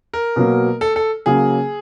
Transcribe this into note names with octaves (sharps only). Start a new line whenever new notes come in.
A#4
B2 F#3 A#3
A4
A4
C#3 F#3 A#3 G#4